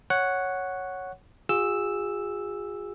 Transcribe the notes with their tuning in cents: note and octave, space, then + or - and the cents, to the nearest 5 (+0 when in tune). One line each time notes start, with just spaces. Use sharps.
C#5 +0 F#5 +0
F4 +45 G#4 -25 E6 +0